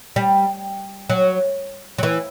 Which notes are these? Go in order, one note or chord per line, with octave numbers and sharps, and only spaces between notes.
G3
F#3
F#3
E3